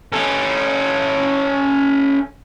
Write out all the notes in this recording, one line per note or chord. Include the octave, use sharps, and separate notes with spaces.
C#4 A4